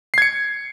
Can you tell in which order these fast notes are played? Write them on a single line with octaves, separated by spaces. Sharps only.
C7 G#6 C#7